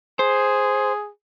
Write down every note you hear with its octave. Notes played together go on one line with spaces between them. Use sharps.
G#4 C5